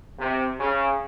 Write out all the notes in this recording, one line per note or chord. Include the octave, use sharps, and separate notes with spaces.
C3
C#3